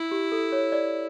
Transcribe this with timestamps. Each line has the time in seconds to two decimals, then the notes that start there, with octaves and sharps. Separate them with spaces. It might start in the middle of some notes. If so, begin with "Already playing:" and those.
Already playing: E4
0.11 G4
0.32 A4
0.52 C#5
0.72 D5